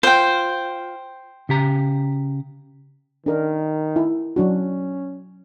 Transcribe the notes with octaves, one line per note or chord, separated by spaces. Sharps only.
F4 C5 G5
C#3 G4 A#5
D#3 D4 A#4
E4
F#3 C#4 D4 F#4